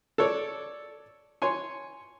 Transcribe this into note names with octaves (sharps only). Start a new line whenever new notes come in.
A4 C#5 D5
C#5 G#5 C6